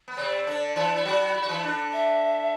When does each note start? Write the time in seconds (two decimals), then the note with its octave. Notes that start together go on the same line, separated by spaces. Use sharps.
0.08 B3
0.17 C3 C4 D5
0.47 D3 D4
0.76 E3 E4
0.96 E4
1.05 F#3 F#4
1.34 E4
1.42 F#4
1.49 E3 E4
1.63 D3 D4
1.93 E5